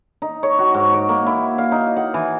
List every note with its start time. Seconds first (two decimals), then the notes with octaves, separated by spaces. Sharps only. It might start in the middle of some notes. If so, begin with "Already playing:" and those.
0.22 D#4
0.43 C#5
0.59 F#4
0.74 G#2
0.93 D6
1.09 A#3
1.27 E4
1.58 F5
1.72 D#4
1.96 F#5
2.14 E3